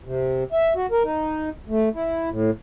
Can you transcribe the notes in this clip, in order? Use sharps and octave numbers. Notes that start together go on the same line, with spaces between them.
C3
E5
F#4
A#4
D#4
A3
E4
A2